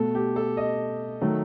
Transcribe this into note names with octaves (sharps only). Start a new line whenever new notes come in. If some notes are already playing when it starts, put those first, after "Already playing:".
Already playing: B2 A3 A4
G4
A4
D#5
D#3 F#3 A3